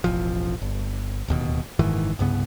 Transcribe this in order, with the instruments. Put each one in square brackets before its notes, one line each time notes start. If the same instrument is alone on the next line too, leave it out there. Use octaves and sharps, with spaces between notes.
[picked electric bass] E1 A1 F3
G1
D1 D#2 B2
F#1 G#2 D#3 E3
C2 G2 C#3 B3